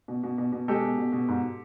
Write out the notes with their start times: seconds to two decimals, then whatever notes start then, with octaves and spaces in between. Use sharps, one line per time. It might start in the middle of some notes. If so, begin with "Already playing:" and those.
0.08 B2
0.23 B2
0.38 B2
0.52 B2
0.68 G#3 G4 A4
0.82 B2
0.98 B2
1.12 B2
1.28 G#2